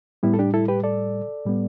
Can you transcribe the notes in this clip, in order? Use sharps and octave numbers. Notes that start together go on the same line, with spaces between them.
A2 G3 B3 E4
A4
D4 G4
E4 A4
G4 B4
A4 D5
A2 G3 B3